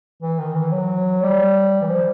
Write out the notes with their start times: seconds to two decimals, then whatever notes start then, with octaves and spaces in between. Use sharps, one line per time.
0.23 E3
0.40 D#3
0.56 E3
0.73 F#3
1.23 G3
1.82 E3
1.90 F3